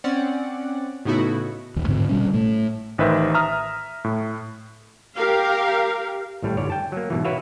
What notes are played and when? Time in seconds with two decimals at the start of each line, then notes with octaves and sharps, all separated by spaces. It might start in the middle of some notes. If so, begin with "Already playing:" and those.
0.04 C4 C#4 D5 F#5
1.05 A2 C#3 B3 D#4 E4 F#4
1.76 D#1 D#2
1.88 G#2 D3 C4
2.09 G#1 B2 G3 C#4
2.33 A2 A3
2.98 A1 D#3 B4 C5 E5
3.34 E5 A#5 D#6 F6
4.04 A2
5.16 G4 A#4 F5
6.42 G#1 A2 G3
6.57 G1 G#2 C#5 D5
6.70 G5 A5
6.92 F#3 A#3
7.10 G#2 B2 E3
7.24 E4 F#4 B4 C#5 E5 F5